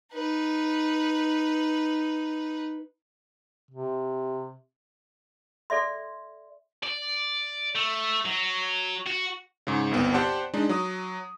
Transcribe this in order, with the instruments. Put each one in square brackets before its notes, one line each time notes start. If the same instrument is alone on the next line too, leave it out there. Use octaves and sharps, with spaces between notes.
[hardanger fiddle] D#4 B4
[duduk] C3
[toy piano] A4 D5 E5 C6
[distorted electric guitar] D5
A3
F#3
F#4
[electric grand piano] G#2 C#3
G1 C2 B3 C4
G4 C5 D5 F#5 G5 A5
G#3 D4 D#4
F#3 D#6